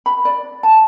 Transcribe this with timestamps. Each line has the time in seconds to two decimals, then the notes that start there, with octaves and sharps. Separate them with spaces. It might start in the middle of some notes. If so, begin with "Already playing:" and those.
0.06 B5
0.25 D5
0.63 A5